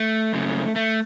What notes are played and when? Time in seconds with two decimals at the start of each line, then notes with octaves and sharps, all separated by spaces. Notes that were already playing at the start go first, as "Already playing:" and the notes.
Already playing: A3
0.33 F#2 C#3
0.76 A3